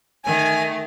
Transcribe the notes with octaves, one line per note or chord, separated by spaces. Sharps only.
D#3 A3 G#5